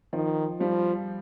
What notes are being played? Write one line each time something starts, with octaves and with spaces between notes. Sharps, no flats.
D#3 F3
F3 G3